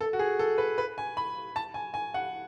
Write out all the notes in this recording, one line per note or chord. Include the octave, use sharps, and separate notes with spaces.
A4
F#4
G#4
A4
B4
B4
G#5
B5
A5
G#5
G#5
F#5